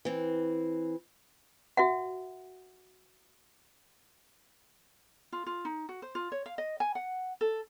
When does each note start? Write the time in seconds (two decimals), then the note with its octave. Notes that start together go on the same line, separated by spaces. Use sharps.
0.05 E3 C4
1.77 F#4 E5 F#5
5.32 F4
5.46 F4
5.65 D#4
5.89 F#4
6.02 C5
6.15 F4
6.32 C#5
6.46 F5
6.58 D#5
6.80 G#5
6.95 F#5
7.41 A4